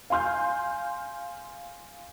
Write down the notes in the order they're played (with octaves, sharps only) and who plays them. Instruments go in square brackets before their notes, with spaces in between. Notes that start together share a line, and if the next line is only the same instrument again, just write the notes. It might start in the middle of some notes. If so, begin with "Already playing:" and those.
[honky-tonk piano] F5 G#5 C6 F6 G6